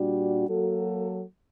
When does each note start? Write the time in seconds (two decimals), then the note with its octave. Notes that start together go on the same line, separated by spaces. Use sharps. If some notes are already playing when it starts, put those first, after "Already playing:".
Already playing: A#2 G3 D4 F#4
0.46 F#3 A#3 F#4 A4